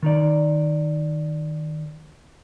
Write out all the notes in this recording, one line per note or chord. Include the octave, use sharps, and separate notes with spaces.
D#3 D#4 D5